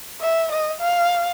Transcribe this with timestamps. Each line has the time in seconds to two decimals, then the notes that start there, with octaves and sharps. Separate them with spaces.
0.21 E5
0.52 D#5
0.80 F5